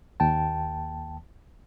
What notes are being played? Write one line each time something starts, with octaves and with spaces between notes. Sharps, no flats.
D#2 G5 A5